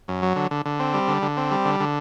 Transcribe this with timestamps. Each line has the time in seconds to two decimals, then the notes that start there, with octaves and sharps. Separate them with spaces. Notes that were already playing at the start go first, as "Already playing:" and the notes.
0.08 F#2
0.22 F#3
0.36 D3
0.51 D3
0.66 D3
0.80 C4
0.94 G3
1.08 D3
1.22 D3
1.37 C4
1.51 G3
1.65 D3
1.80 D3